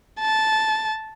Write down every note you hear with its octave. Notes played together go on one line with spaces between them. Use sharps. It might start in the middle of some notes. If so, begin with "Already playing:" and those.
A5